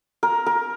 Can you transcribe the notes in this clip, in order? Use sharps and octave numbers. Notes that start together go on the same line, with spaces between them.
A#4
A#4